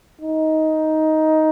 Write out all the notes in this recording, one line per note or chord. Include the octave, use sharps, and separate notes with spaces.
D#4